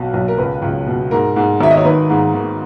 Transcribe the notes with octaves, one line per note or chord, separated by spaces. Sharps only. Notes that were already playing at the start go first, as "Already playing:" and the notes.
Already playing: B1 B2
B1
A#4
C#2 B4
C#2
B2
G#2 A#4
G#2
G#1 E5
D#5
C#5
D#3 B4
G#2
D#3